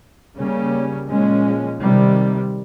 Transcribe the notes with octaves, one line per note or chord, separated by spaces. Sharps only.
C#3 G3 A#3 C#4
A#2 F3 G#3 C#4
C3 D#3 G3